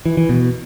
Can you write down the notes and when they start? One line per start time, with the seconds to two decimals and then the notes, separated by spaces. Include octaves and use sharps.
0.06 E3
0.17 E3
0.29 B2